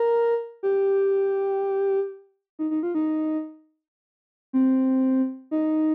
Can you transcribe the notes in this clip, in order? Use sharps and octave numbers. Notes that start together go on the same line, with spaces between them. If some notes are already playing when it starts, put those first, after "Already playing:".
Already playing: A#4
G4
D#4
D#4
F4
D#4
C4
D#4